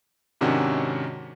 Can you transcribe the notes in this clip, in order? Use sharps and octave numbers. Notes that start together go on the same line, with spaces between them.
G#2 C3 D#3 C#4 D4 F#4